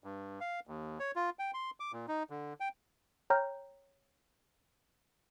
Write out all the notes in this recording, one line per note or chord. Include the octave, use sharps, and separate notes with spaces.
G2
F5
D#2
C#5
F4
G5
C6
D6
A#2
D#4
D3
G5
C#5 G5 A#5 F6 G6